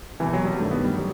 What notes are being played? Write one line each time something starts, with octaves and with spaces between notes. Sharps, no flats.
C2 B2 E3
F#3
G3
G1 G2 D#3 A3
B3
G3
F#3